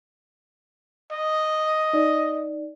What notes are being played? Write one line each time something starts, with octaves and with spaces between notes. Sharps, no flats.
D#5
D#4 D5